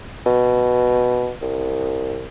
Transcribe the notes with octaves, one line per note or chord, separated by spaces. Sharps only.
B2
C2